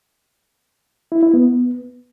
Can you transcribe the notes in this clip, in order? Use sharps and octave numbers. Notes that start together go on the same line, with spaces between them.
E4
E4
B3